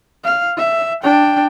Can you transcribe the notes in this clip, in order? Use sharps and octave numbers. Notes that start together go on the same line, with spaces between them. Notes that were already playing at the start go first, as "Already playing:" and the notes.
F5
E5
D4 G5